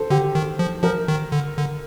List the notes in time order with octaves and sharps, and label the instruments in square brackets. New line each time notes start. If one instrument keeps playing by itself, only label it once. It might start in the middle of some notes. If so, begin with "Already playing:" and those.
Already playing: [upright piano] A4 C5
[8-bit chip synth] D3 [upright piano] G4
[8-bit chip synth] D#3
F3
[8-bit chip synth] F3 [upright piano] A#4
[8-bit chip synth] D#3
D3
D3